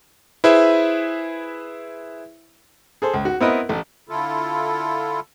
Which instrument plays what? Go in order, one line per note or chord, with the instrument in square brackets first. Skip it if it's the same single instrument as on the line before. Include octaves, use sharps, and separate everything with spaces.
[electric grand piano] E4 G#4 B4 C5 E5
[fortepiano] G#4 A4 C5
C#2
F#4
B3 C4 E4 A#4 B4 D#5
A1 A3
[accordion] D3 E4 F4 A4